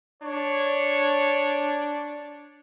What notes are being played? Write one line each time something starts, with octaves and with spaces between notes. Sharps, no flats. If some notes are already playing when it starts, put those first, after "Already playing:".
D4 C#5